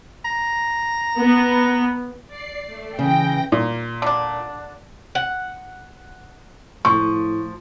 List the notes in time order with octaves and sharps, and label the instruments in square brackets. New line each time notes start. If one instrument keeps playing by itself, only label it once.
[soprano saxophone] A#5
[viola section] B3
[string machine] D5 C7
A3
[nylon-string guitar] C#3 [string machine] E3 A#6 [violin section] G5
[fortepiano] A#2
[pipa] D3 D4
[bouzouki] F#5
[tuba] A2 [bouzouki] F3 [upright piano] C#6